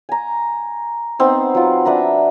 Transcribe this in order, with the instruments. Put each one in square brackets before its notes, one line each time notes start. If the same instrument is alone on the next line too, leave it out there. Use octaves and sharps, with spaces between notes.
[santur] G#5 A#5
B3 C4 D#4 C5
F#3 F4
D4 B4 E5 A#5